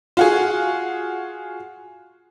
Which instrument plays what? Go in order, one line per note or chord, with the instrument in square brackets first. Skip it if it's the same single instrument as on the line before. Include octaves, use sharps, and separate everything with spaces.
[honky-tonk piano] F4 F#4 G#4